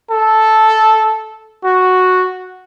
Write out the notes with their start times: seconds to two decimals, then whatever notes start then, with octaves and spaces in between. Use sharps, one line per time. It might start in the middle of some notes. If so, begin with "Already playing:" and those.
0.10 A4
1.65 F#4